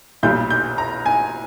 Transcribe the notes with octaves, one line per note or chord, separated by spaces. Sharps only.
B1 A#2 G3 G6
G6
A#5
G#5